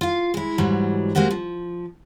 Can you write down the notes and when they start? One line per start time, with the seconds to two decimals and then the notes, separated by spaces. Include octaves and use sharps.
0.01 F4 F5
0.34 G#3 E4
0.58 G#2 E3 F#3 G3
1.15 G#3 A#3 C4 F#4 G4
1.31 F3